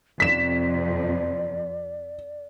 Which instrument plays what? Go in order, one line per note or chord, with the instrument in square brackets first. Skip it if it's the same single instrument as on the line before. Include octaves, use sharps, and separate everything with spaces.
[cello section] F2 C3 [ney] D5 [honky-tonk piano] B6 E7